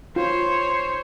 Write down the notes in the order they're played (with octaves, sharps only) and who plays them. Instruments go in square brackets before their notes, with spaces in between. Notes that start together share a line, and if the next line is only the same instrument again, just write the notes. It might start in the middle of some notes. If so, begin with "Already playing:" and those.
[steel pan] F4 [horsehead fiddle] C5 C#5